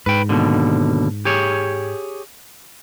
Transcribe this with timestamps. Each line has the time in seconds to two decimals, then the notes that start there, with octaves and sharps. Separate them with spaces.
0.06 G#2 B4 G5
0.29 D#2 B2 D3
1.25 G4 G#4 C#5